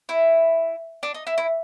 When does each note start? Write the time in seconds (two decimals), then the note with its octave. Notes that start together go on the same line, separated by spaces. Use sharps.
0.09 E4
1.03 D4
1.14 D#4
1.27 E4
1.38 E4